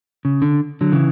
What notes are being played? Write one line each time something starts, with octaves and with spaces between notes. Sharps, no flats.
C#3
D3
D3 F#3
C#3 E3